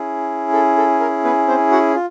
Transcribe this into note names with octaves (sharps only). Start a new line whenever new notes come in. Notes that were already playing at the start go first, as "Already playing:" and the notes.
Already playing: C#4 E4 G#4
A4
A4
A#4
B3 B4
C4 C5
F#4 F#5
F4